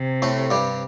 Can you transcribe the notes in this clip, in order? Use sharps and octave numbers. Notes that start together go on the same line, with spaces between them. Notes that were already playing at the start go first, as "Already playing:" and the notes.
Already playing: C3
A2 A3
G2 G3